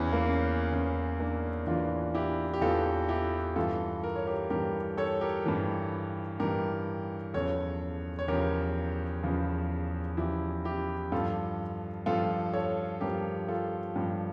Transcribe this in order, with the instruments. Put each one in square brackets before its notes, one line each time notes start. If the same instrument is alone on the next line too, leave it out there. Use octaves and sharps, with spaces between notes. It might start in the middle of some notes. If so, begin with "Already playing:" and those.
Already playing: [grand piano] E2 E3 C#4 E4
A#3
C#4
E2 E3 C#4
A#3 D4
E2 E3 D4 F4
E4 G4
G4
E2 E3 F4 A4
E4 G4
G2 E3 F4 A4
A#4
C#5
G4 A#4
G2 E3 G4 A#4
A4 C#5
G4 A#4
G2 E3
G2 E3 G4 A#4
E2 C#3 F3 A4 C#5
C#5
E2 C#3 F3 G4 A#4
E2 C#3 F3
E2 C#3 F3 E4 G4
E4 G4
G2 F3 F4 A4
G2 F3 F4 A4
A4 C#5
G2 F3 G4 A#4
F4 A4
G2 F3